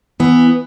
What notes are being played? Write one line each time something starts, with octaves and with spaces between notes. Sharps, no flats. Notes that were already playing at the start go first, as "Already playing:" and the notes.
E3 B3